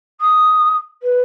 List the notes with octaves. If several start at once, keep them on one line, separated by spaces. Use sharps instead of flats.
D#6
B4